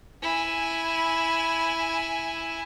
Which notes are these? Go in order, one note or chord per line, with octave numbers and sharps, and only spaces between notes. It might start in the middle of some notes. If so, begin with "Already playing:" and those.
E4 G#5